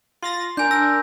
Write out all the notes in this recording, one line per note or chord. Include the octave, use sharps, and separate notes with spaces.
F4 C6 A6 A#6
D4 A#4 G#5 G6
E6 A#6